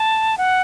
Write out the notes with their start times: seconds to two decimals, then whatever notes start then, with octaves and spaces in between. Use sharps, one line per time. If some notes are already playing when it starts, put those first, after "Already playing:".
Already playing: A5
0.38 F#5